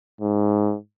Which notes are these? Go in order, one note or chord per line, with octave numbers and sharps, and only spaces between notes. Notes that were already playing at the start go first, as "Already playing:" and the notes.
G#2